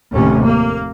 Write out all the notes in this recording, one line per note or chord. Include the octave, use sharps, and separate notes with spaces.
F1 D#2 A2 C3 C#4
A#3